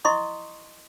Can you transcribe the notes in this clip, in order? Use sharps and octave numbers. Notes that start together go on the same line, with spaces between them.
E4 D#5 C6 C#6 D#6